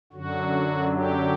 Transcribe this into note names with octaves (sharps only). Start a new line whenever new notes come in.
F#2 D3 F#3 F#4
G4